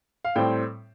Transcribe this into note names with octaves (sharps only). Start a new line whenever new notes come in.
F5
A2 G3 C4 G5